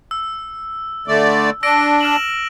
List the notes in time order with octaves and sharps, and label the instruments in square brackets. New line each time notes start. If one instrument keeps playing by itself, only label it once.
[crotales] E6
[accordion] D3 A3 D5
[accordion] D4 [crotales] E6 A#6 D7
[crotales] F6 E7 F#7